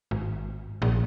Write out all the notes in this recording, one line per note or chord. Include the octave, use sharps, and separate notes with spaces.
G#1
A#1